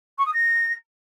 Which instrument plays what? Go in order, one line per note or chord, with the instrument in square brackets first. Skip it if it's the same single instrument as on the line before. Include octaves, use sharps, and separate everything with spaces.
[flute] C#6
D#6
A#6